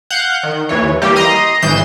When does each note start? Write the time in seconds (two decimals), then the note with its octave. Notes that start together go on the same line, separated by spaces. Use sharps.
0.10 F5 F#5 F#6 G6
0.43 D#3
0.69 D#2 E3 C#5
1.01 E3 G3 A#3 G4
1.16 D#5 A#5 C6 D#6
1.62 G#1 E3 G6 C7 E7